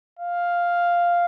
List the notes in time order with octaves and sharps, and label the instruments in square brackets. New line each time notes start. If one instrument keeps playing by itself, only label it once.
[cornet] F5